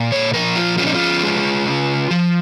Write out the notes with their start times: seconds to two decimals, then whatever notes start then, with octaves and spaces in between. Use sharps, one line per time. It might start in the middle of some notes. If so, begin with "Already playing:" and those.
Already playing: A#2 A#3
0.12 C#5
0.34 F3 A#4
0.56 F4
0.78 C#4 F4
0.86 D#4
0.95 F4
1.23 G#3
1.66 C#3
2.11 F3